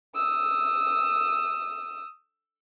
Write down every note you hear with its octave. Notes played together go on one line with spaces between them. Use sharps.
D#6 E6